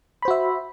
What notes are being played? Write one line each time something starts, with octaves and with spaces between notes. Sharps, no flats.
F#4 C5 E5 B5